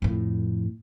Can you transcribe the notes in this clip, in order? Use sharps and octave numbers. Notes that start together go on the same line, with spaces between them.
F2 A2